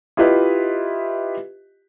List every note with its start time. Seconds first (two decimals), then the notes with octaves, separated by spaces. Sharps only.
0.17 E4 F4 G4 B4 D#5 E5